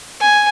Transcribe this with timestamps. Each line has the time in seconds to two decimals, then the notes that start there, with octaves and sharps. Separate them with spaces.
0.21 G#5